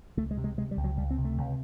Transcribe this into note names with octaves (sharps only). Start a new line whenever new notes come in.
C#2 A3
G#3
C3
G#3
C3 G#3
G3
C#2
F#3
C#2 G3
C4
C3
A3
C#2